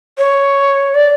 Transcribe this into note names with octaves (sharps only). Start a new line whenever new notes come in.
C#5
D5